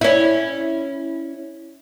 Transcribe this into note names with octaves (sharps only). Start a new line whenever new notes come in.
C#4 E4